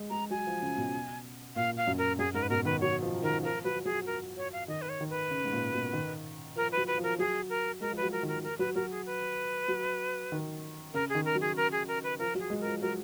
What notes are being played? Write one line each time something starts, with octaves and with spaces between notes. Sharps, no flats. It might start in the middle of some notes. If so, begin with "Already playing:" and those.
Already playing: G#3
G#3 A#5
F#3 G#5
F3
C#3
B2
A#2 F5
F5
F#2
A#4
F#2 G#4
G#2 A#4
B4
B2 A#4
D#3 B4
F#3 C#5
F3
D#3 A#4
F3 A#4
F#3 B4
F#3 G#4
A#4
C#5
F5
D#3 D#5
B4
C#5
D#3
B4
C#3
G#2
A#2
B2
D#3
F3 A#4
B4
F#3
B4
F3
A#4
F#3 G#4
A#4
G#3 A#4
F3
B4
F#3
A#4
D#3
A#4
A#4
F#3 B4
F#3 A#4
G#4
B4
F#3
D#3
C#3 A#4
G#4
D#3
A#4
F#3
G#4
A#4
G#4
A#4
B4
F3 A#4
F#3
G#4
G#3
A#4
F3
F#3 A#4